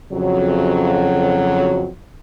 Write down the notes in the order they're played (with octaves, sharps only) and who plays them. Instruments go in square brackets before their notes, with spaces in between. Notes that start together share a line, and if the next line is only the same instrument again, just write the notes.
[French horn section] F2 C#3 F#3